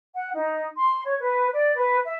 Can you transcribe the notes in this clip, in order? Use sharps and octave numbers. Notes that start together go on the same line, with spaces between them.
F#5
D#4
C6
C#5
B4
D5
B4
E5